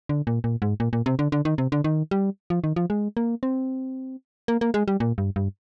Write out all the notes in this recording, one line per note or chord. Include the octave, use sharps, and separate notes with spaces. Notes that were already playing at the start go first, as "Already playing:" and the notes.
D3
A#2
A#2
G#2
A#2
A#2
C3
D3
D3
D#3
C3
D3
D#3
G3
F3
D#3
F3
G#3
A#3
C4
A#3
A#3
G#3
G3
A#2
G2
G2